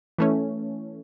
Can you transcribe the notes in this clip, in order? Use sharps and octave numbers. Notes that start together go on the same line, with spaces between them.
E3 A3 C#4